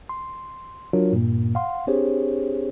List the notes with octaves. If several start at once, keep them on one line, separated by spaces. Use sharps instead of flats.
C6
F#3 D4 F4 F#4 A#4 C#5
G2 A#2 A#3
F5 F#5 C6
C4 D4 G4 G#4 C5 C#5